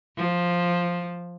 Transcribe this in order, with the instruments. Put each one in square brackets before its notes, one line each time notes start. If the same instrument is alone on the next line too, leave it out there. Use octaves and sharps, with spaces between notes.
[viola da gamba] F3